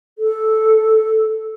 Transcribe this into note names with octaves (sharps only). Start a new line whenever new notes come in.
A4